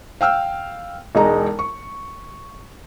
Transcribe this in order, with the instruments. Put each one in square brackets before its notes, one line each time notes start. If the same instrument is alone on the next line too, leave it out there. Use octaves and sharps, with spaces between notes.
[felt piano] F5 G5 E6 F6
E1 G#3 D#4 A#5
C#6